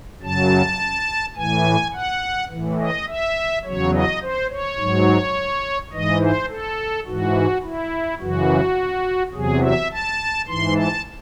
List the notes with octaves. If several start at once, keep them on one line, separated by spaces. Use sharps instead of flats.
F#2 C#3 F#3 A5
A2 E3 G#5
F#5
A2 E3
D#5
E5
E2 C#3 F#3 C#5
D#5
C5
C#5
G#2 F#3
G#2 E3 D#5
C5
A4
G#2 E3 F#4
E4
F#2 C#3 E3 F#4
E2 C3 F#3 G#4
E5
A5
G#2 E3 C6
A5